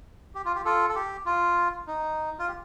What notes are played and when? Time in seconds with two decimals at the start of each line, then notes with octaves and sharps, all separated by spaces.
0.35 G4
0.45 F4
0.55 G4
0.65 F4 A4
0.89 A4
0.96 G4
1.26 F4
1.87 D#4
2.39 F4
2.48 G4